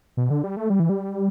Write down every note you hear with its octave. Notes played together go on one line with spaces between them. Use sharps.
B2
D3
G3
A3
G3
E3
G3